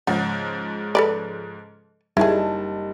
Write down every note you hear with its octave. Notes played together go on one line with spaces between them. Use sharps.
G#2 C#3 F3 F#5
A4 B4 D5
F#1 G3 D#4 E4 G#4 A5